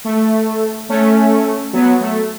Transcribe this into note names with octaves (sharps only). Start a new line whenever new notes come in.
A3
A3 C#4
F#3 B3
A3